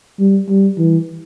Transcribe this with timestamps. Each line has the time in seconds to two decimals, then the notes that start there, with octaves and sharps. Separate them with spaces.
0.19 G3
0.49 G3
0.78 E3